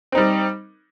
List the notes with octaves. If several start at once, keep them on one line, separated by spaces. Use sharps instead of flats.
G3 C4 D#4